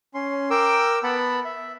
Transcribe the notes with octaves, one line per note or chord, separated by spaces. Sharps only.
C#4 C6
A#4 G5 D6 E6
B3 F#5 A5 B5
E5